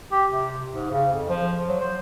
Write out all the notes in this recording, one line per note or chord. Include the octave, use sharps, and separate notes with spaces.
G4
C3
G#2
C#3
F2
F3
F#3
C5